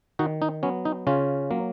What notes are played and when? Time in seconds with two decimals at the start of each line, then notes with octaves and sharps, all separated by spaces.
0.19 D#3 D#4 F#4
0.42 D#4
0.63 F#3 B3 C#4
0.85 D#4
1.07 C#3 C#4 F4
1.51 F#3 A#3